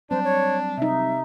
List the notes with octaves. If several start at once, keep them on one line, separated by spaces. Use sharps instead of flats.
F#3 G3 C4 D4 C5
C#5
C3 D#4 E5